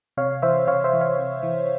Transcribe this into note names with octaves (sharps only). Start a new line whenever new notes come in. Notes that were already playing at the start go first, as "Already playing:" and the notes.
C3 C#5 F5
E3 C5 E5
C3 C#5 F5
C5 E5
E3
C#5 F5
C3
E3